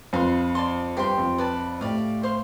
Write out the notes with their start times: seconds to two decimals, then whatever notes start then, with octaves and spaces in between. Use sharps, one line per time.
0.13 F2 B4 F5 C6
0.55 D5 A5 C6
0.97 G2 G4 C5 G5 C6
1.18 F2
1.38 B4 D5 A5
1.81 A2 G4 D5 F5
2.23 C5 F5 C6